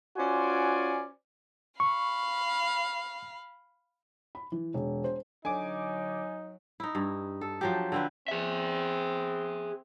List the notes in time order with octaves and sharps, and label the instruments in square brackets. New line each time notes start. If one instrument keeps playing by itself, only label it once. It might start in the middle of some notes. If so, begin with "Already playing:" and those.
[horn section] C#4 F4 F#4 C5 D5 G#5
[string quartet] F5 B5 [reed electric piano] C#6
[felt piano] B5
E3
E1
C5
[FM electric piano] D3 D6 [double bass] F#3 [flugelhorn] D#4 [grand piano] G#5
[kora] D#4 E4
G2
A4
F3 F#3 G4
D3 C4 B4
[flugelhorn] C4 [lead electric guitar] G#4 E5